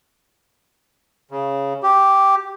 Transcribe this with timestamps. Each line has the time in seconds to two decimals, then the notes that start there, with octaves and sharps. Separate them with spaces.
1.31 C#3
1.83 G4